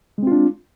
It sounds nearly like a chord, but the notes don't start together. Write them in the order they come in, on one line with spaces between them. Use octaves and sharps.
G#3 C4 F4 D4